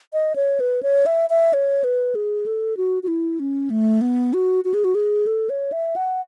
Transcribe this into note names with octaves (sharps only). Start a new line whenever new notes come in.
D#5
C#5
B4
C#5
E5
E5
C#5
B4
G#4
A4
F#4
F#4
E4
C#4
A3
B3
F#4
F#4
G#4
F#4
G#4
A4
C#5
E5
F#5